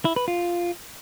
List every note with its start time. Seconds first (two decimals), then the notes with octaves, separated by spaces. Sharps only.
0.05 E4
0.16 B4
0.28 F4